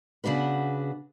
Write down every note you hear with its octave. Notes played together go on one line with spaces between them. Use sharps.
C#3 B3 D4 F#4 B4